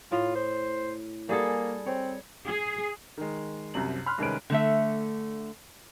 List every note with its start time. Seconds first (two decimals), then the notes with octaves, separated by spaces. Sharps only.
0.12 A2 F4
0.35 C5
1.29 G3 A#3 G#4 A4
1.86 C4 C#5
2.46 G#4
3.17 D#3 G#3
3.74 C2 F#2 C3 F#7
4.06 B5 C6 F6 F#6
4.18 C2 D#3 G#3 C#4 B4 D7
4.50 D3 A3 E5